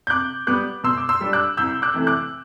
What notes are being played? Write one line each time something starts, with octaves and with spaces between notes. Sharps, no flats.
G6
C3 D6 F#6
G3 B3 D6 F#6
B2 C6 E6
D6
C6 E6
G3 D4
D6 F#6
C2 E6 G6
D6 F#6
C3 E3 A3
D6 F#6